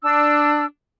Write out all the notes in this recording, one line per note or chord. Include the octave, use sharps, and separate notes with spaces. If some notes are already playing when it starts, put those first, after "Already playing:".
D4 E6